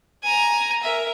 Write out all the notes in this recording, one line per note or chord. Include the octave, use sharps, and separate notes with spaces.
G#5 A#5
A#4 E5